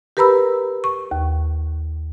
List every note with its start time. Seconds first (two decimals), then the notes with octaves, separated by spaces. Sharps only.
0.17 G4 A#4 B4 A#5 B5 E6
0.84 C#6
1.11 D#2